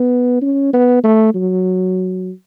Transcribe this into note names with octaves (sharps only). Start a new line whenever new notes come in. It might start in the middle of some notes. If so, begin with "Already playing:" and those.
Already playing: B3
C#4
B3
A3
F#3